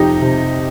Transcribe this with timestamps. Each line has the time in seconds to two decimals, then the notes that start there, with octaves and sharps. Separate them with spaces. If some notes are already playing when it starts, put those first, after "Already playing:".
Already playing: F2 C3 D#4 G4
0.22 C3